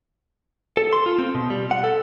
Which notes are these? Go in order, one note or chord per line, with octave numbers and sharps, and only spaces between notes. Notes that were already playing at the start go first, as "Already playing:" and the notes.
A4
C6
F4
C4
B2
G3
F#5
A4